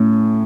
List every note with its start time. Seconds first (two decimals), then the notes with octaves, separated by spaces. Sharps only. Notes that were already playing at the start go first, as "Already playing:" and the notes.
Already playing: A2 C#4